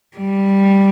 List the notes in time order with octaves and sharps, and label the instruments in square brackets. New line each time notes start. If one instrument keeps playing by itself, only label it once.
[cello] G3